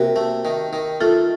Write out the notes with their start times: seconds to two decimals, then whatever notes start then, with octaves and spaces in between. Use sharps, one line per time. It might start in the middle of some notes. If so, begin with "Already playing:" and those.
Already playing: C3 A#3 F#4 A#4
0.16 A3
0.45 D#3
0.73 D#3
1.01 A3 F4 A4